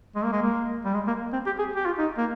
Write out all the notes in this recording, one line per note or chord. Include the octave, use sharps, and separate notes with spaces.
G#3
A#3
G#3
A#3
G3
G#3
A#3
C4
G4
G#4
G4
F4
D#4
A#3